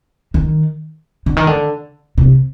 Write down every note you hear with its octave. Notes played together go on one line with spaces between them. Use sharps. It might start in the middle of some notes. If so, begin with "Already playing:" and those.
D#3
D3
D#3
D3
C3